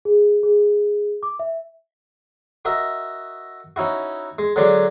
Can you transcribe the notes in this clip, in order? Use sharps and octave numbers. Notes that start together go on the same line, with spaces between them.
G#4
G#4
D6
E5
F#4 A#4 D#5 E5
C#4 D#4 E4 F#4
G#3
D3 F#3 G#3 C#4 D4